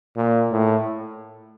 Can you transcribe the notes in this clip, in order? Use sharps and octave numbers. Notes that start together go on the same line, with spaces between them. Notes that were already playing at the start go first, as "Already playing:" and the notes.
A#2
A2